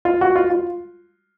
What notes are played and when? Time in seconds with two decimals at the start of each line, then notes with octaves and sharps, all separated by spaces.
0.05 F4
0.21 F#4
0.36 F4
0.50 F4